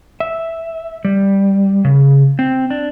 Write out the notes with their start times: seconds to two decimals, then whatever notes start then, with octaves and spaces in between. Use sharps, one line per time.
0.20 E5
1.05 G3
1.85 C#3
2.39 C4
2.70 D4